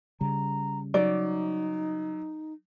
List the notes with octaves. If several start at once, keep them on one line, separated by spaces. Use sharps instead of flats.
C#3 G3 A#5
F#3 D#4 D5